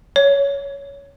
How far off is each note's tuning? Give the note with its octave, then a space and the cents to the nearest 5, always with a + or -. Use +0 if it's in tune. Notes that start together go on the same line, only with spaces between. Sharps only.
C#5 +15